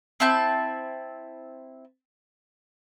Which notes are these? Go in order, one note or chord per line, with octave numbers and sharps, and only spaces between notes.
C4 E4 A5 G6